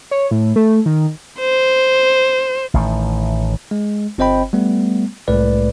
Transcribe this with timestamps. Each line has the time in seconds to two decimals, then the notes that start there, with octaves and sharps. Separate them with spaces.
0.11 C#5
0.31 A2
0.56 A3
0.86 D#3
1.40 C5
2.74 A1 A2 D#3
3.71 G#3
4.18 G1 C4 C5 D#5 G5 B5
4.53 G3 A3 B3
5.28 C2 A2 G#3 A3 B4 D5